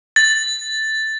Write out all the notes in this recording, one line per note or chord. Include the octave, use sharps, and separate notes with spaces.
A6